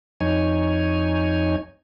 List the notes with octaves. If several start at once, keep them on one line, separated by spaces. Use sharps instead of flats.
F2 D#4 C#5 G#5